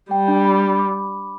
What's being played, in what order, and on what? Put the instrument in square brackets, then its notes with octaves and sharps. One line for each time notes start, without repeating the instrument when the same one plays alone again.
[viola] G3 [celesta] G5
[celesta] D4
B5
B5
D6